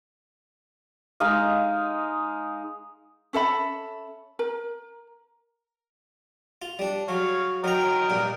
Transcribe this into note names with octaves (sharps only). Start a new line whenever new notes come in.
G#3 D#4 D#5 F5
C#4 A4 E5 B5
A#4
F4
G3 D4
F#3 C#5 F5
F#3 A#4 D#5 G5 A#5
G2 A#2